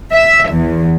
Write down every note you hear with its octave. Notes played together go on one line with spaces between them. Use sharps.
E5
E2